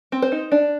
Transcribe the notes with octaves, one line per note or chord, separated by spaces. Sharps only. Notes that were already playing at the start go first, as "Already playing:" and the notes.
C4
C5
D#4
D4